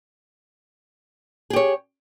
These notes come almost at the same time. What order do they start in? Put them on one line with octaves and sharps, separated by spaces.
G#4 G4 C#5